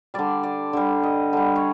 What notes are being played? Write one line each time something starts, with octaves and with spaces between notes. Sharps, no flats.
D3 G3 D5
D5
D3 G3
D#5
D3 G3
C#5